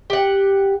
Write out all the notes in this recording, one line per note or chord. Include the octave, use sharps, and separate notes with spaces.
G4 F#5